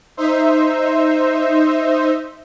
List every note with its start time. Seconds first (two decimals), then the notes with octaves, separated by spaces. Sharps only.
0.17 D#4 C5 E5